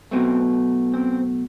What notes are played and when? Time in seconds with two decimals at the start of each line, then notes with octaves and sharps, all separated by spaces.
0.11 B1 B2 A3 C4
0.94 C4